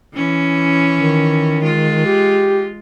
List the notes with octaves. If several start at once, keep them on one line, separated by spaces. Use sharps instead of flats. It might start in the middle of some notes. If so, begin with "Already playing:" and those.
E3 C#4
D#3
G#3 F4
G4